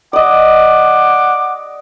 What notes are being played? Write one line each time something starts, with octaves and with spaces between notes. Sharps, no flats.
D5 D#5 F#5 D6